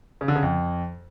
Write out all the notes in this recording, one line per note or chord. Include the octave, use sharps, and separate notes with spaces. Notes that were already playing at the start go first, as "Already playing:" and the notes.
C#3
D3
C#3
F2